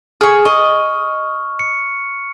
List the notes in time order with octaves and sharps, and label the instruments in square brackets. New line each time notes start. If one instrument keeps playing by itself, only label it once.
[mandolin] G#4 C#6 [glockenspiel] F6
[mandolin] D#5 [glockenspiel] C#6
[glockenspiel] C#7